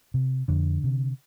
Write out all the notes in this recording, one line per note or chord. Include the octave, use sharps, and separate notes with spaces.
C3
F2 D3
C3